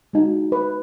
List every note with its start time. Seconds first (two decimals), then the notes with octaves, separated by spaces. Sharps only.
0.13 G#3 D#4 F#4
0.52 B4